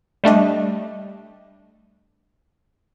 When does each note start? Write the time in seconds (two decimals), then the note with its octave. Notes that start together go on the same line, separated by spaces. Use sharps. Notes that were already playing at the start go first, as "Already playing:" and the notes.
0.24 G3 A3 D4 D#5